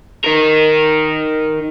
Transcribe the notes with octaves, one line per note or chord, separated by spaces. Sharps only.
D#4 A#4